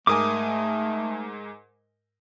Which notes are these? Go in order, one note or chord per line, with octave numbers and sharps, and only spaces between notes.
G#2 A3 A#4 G#5 D6 D#6